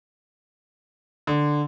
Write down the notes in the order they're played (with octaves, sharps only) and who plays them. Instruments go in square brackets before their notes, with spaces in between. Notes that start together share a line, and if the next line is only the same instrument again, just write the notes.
[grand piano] D3